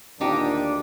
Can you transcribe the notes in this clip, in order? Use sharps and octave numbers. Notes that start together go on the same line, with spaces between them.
D2 A#2 D#3 D4 D#4 G4